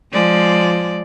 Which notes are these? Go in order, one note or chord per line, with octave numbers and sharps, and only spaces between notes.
F3 G#3 D5